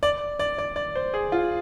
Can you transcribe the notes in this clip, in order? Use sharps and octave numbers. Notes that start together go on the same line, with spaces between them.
D5
D5
D5
D5
C5
G#4
F4